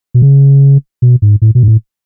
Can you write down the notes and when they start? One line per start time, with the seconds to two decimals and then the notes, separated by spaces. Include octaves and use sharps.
0.14 B2
0.22 C#3
1.02 B2
1.22 G#2
1.42 A2
1.55 B2
1.63 G#2
1.68 A2